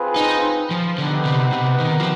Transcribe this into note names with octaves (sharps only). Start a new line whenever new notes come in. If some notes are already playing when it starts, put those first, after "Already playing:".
Already playing: C4 F4 G#4 B4
D#4
F3
D3 B3 D#4 G4 B4
C3
C3
D#3
F3